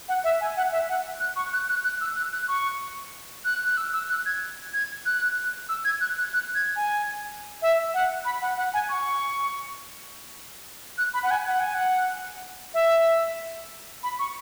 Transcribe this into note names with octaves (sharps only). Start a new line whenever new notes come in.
F#5
E5
G#5
F#5
E5
F#5
F#6
C#6
F#6
F#6
F#6
E6
F#6
F#6
C#6
F#6
F#6
E6
E6
F#6
G#6
G#6
F#6
E6
G#6
F#6
F#6
F#6
G#6
G#5
E5
F#5
B5
F#5
F#5
G#5
C#6
F#6
B5
F#5
G#5
F#5
G#5
F#5
E5
B5
C#6